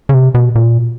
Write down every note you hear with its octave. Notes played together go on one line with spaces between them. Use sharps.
C#3
C3
B2
A#2